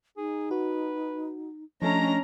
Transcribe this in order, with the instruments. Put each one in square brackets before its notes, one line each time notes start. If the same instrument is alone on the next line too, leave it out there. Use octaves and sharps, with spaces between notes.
[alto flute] D#4 [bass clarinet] G#4
[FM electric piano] F#4 [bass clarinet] B4
[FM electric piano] F3 A3 A4 [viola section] C#4 A#5 [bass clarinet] D4 [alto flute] D#5